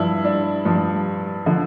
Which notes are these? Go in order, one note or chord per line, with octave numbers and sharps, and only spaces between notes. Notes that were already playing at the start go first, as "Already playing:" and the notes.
Already playing: G2 F3 E4
D4
G2 F3
D3 F3